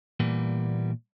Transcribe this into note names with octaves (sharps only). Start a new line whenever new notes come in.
A#2 E3 G3 A#3 B3